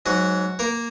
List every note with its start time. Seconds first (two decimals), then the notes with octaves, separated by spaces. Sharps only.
0.06 G#2 F#3 F#4
0.59 A#3 A#4